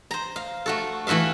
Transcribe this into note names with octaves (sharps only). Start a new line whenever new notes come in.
C5 A#5
F5
A3 F#4 A4
E3 A3 F#4 E5 F5